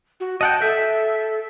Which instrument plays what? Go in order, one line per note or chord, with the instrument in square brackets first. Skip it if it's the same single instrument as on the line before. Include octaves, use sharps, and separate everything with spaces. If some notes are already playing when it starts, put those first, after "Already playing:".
[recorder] F#4
[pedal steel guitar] D#5 F#5 G5 [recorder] A5
[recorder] A4 [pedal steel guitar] E5